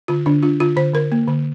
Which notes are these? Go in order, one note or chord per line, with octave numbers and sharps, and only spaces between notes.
D3 F4
D3 D4
D4 F4
D3 F4
D3 C5
D3 A#4
A#3
D3